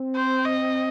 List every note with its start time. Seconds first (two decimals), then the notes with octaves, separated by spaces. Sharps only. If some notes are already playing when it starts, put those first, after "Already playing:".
Already playing: C4
0.16 C5
0.45 D#5